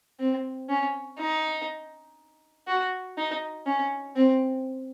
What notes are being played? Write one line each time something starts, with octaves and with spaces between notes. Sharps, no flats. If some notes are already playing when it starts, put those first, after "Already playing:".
C4
C#4
D#4
F#4
D#4
C#4
C4